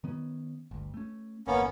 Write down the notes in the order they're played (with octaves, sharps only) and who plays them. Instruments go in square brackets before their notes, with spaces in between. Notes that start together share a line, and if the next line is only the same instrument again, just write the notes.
[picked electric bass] D#3 B3 C#4
G1 D2
A3 C#4
[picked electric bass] G1 E2 [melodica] A#3 B3 C#4